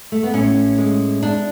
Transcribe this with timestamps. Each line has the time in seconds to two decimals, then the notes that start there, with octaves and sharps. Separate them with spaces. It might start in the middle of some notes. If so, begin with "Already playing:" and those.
0.12 A3
0.23 B3
0.33 A2 C#4
0.78 G#3
1.22 G#3 D4